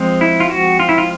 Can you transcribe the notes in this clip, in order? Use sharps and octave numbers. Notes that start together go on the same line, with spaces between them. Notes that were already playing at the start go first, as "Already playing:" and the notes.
Already playing: F3 G#3 C4
E4
F4
F#4
F4
E4
F4